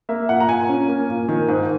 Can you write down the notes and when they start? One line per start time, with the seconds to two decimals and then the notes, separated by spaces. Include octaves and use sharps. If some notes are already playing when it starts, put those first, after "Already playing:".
0.09 A#3 E5
0.29 A#2 F#5
0.40 A#5
0.48 A#2 G#5
0.69 C#4
0.88 A#3
1.09 A#2
1.29 D#3
1.48 G#2